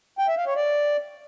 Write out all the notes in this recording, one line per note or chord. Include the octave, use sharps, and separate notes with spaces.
G5
E5
F5
C#5
D5